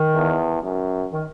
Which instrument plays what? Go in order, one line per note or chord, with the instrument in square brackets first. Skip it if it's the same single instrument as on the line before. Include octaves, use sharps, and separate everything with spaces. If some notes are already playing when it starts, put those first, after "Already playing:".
Already playing: [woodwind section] D#3
[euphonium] E2
F#2
[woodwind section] D#3